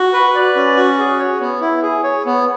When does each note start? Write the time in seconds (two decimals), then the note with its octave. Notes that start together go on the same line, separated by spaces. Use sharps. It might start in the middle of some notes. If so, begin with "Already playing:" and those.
Already playing: F#4
0.13 B4
0.35 D5
0.56 C#4
0.76 F#4
0.98 G#4
1.19 C#5
1.40 B3
1.61 E4
1.82 G#4
2.03 C#5
2.26 B3